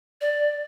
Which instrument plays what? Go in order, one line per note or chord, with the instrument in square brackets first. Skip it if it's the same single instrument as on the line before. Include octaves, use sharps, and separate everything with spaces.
[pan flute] D5